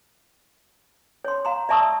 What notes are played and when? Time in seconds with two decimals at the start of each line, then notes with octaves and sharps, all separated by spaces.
1.25 C#5 C6
1.45 F5 A#5 C6
1.69 D5 E5 A5 C#6 D#6 E6